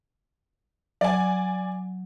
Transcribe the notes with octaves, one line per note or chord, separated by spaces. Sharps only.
F#3 D5 G#5